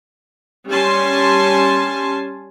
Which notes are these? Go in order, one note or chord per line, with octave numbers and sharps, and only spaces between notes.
G3 C#4 G#5 A5 C6